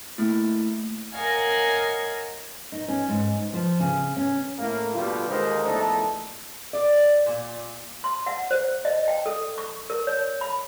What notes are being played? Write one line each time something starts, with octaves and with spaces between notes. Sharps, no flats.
A3 A#3 E4
A#4 C#5 D#5 F5 F#5 G#5
D#4
C#4
G#2
F3
C#3
C#4
A2 A#3
B2 D3 G3 F4
D#2 D3 G#3 D#4 A#4 C5
A#1 E2 A3 D4 D#4 A4
D5
A#2
C6
F#5
C5
D#5
G5
A4
C#6
A#4
C#5
B5